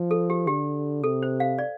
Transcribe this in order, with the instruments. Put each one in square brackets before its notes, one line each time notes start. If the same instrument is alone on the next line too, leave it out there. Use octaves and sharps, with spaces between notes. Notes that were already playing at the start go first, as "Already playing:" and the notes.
Already playing: [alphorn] F3
[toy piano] A4
G4
[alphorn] D3 [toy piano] G4
[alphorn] C3 [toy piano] A4
[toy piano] C5
F5
D5